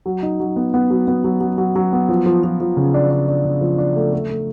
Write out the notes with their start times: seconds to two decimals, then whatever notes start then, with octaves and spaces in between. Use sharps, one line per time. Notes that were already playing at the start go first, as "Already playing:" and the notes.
0.06 F#3
0.23 D#4
0.40 F#3
0.56 B3
0.74 B3
0.90 F#3
1.08 B3
1.24 F#3
1.41 F#3
1.58 F#3
1.76 F#3
1.93 B3
2.09 F3
2.26 F3
2.44 F3
2.61 F3
2.77 C#3
2.94 D4
3.11 D4
3.28 D4
3.45 C#3
3.61 F3
3.78 D4
3.96 A3
4.13 A3
4.30 A3